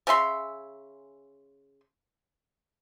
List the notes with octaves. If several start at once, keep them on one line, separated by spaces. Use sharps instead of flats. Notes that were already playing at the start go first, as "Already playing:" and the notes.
C#3 C#4 E5 C6